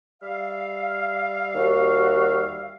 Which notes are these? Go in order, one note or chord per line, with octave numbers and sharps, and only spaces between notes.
G3 E5 F5
D#2 F#4